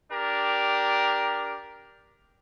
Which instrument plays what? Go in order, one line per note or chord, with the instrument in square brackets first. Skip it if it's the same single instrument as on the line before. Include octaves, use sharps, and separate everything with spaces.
[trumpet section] D4 G4 A#4